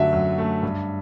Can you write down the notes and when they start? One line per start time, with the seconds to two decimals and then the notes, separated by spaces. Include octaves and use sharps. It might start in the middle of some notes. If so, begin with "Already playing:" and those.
Already playing: F#2 D3 F#3 A3 E5
0.12 F#2
0.38 A3
0.63 G2